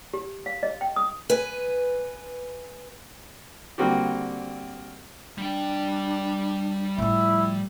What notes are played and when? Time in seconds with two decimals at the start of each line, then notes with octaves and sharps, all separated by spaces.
0.14 G4
0.46 F5
0.63 D#5
0.81 G5
0.96 D#6
1.30 B4 G#5
3.78 D3 G3 A#3 C4 F#4 G4
5.38 G3 D4 G5
6.98 A2 F3 E4